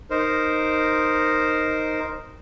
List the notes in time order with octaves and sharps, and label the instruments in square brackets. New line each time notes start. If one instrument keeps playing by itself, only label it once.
[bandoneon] D#4 A#4 C5